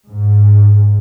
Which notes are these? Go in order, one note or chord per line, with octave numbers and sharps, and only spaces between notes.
G#2